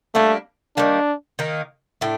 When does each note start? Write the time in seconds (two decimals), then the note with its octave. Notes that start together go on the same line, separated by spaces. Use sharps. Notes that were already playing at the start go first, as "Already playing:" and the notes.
0.15 G3 A3 A#3 D4
0.77 D#3 G3 A#3 D4
1.39 D#3 A#3 D#4
2.01 A2 A3 D4